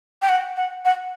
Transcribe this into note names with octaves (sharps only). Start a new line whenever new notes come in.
G5
F#5
F#5
F#5